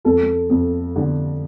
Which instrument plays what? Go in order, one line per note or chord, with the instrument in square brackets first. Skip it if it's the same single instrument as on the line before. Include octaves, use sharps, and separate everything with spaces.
[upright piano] F2 A4
F2
D3